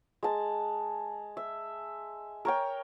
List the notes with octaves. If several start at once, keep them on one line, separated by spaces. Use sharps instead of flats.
G#3 A5
E5
A#4 C#5 G5